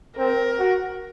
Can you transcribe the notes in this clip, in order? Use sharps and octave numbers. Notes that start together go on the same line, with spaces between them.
C4 A#4
F#4